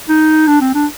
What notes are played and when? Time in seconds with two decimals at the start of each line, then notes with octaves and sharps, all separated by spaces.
0.09 D#4
0.47 D4
0.61 C4
0.74 D4